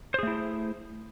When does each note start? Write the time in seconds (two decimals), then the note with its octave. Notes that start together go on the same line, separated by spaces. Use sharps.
0.14 C5
0.19 G#4
0.23 A3
0.27 E4